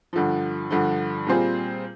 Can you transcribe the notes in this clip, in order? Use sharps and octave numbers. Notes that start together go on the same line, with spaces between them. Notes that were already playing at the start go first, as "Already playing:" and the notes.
G2 D3 F3
G2 D3 F3
A#2 G3 C4 F4 G#4